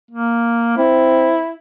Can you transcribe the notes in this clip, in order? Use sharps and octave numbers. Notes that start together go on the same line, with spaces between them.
A#3
C4 E4